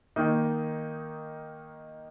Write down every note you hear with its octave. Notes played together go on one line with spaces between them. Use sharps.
D#3 A#3 D#4